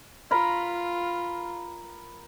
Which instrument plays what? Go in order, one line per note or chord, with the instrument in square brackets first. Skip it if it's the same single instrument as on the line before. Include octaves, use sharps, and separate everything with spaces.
[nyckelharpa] F4 [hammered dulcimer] A#4 A#5 B5